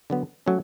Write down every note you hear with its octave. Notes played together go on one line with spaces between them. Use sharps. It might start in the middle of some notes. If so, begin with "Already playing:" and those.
D3 F#3 B3
F#3 A3 C#4